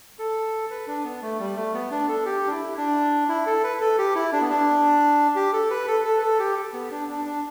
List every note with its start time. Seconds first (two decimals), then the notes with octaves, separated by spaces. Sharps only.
0.19 A4
0.70 B4
0.88 D4
1.05 B3
1.22 A3
1.39 G3
1.57 A3
1.74 B3
1.91 D4
2.09 A4
2.25 G4
2.47 D4
2.51 E4
2.78 D4
3.29 E4
3.47 A4
3.64 B4
3.81 A4
3.98 G4
4.15 E4
4.33 D4
4.41 B3
4.50 D4
5.36 G4
5.53 A4
5.71 B4
5.88 A4
6.05 A4
6.18 B4
6.22 A4
6.39 G4
6.74 B3
6.91 D4
7.08 D4
7.25 D4